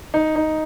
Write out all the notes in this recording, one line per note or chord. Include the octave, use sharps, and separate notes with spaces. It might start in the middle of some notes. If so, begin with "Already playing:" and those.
D#4
D#4